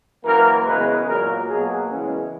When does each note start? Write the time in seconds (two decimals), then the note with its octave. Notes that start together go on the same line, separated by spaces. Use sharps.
0.25 F#2 E3 A#3 A#4
0.66 E2 C#3 G#3 B4
1.07 A#2 F#3 A#3 A#4
1.48 B2 F#3 A#3 G#4
1.89 E2 C#3 E3 G#3 C#4